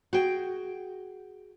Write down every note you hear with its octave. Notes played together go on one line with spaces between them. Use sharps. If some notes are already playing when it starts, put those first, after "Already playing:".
F#4 G#4 G5